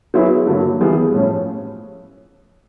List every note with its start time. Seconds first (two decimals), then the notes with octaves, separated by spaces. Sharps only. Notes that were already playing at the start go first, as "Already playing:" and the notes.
0.14 F#3 B3 E4 G#4 B4
0.47 G2 D3 F#3 A#3
0.80 E3 G3 B3 E4 G#4
1.13 A2 F3 A3 C#4